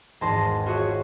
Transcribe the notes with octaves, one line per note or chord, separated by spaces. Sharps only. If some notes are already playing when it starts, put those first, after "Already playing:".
G#1 E2 G#4 A5 C6 A#6
F4 F#4 G#4 C#5 E5